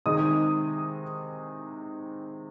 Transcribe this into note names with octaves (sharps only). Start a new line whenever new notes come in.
C3 D#3 G#3 D#4 D#6